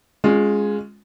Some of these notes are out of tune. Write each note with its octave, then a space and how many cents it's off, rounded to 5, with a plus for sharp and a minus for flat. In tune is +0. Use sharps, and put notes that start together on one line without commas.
G#3 +0 C#4 +0 F4 +20